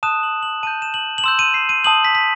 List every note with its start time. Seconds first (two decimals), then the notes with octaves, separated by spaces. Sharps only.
0.03 A5 D#6 F#6 E7
0.23 F#7
0.43 F#7
0.63 A5 D#6 G6 D#7
0.82 E7
0.94 F#7
1.18 F#7
1.24 C6 E6 G6 E7
1.39 D#7
1.54 C7
1.69 D#7
1.84 A5 D#6 G6 F#7
2.05 B6
2.15 B6